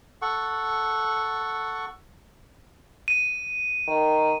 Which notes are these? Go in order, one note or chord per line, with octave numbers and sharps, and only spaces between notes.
A4 F#5 C#6
D#7
D#3